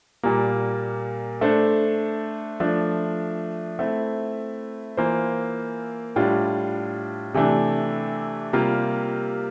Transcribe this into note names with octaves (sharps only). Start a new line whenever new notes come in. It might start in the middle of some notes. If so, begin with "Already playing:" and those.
A#2 G3 A#3
A3 D4 A4 C5
F3 A3 D4
A3 C4 E4
E3 A#3 F4 C5
A2 G3 D4 F4
C3 E3 A3 D4
C3 G3 A#3 F4